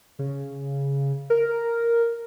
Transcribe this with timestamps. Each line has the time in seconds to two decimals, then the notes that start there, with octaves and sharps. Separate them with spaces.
0.19 C#3
1.30 A#4